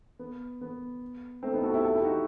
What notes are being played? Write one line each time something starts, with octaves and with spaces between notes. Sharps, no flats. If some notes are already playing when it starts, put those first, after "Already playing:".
B3
B3
A3 C4
B3 D#4
F#4 A4
E4 G4
F#4 A4
E4 G4
D#4 F#4